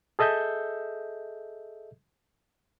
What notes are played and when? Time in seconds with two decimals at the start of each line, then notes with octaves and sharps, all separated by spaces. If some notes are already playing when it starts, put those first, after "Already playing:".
0.19 G#4 A4 D#5 E5 G6